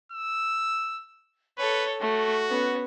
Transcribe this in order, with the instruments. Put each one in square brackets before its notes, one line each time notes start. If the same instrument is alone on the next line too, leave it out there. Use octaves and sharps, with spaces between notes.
[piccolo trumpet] E6
[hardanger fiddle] A4 C#5 [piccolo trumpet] B4
[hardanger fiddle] A3 [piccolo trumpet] F#4
[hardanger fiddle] B3 C#4